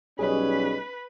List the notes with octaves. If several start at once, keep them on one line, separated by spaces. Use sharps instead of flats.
B1 G3 C#4 G#4 B4 D#5